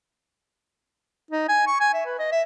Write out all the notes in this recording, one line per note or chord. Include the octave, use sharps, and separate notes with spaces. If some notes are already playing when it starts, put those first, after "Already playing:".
D#4
G#5
C#6
G#5
E5
B4
D#5
E5